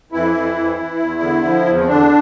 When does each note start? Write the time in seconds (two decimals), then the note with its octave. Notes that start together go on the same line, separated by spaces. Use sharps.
0.12 F2 E3 E4
0.34 F2
0.55 F2
0.78 E3
0.99 E2
1.21 D3
1.44 F3
1.65 E2
1.79 C4
1.88 E2 D3 D4